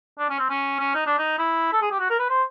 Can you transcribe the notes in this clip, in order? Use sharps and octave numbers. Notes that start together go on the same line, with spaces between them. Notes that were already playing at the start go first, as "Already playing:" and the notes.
D4
C#4
C4
C#4
C#4
D#4
D4
D#4
E4
A4
G#4
G4
F#4
A#4
B4
C5